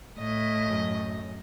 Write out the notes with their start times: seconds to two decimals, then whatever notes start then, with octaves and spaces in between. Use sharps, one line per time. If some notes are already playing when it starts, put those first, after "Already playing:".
0.19 A2 D#5
0.66 F#2